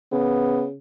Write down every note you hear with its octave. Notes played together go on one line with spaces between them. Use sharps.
C#3 B3